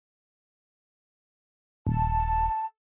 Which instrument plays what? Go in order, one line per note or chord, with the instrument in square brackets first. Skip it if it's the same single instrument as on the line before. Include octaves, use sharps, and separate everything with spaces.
[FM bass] D#1 [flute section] A5